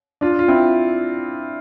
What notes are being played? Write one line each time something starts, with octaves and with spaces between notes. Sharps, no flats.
D4 F4
F4
C4 E4